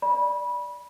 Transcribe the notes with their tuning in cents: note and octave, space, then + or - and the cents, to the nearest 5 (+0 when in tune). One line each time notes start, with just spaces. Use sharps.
D5 +0 B5 -20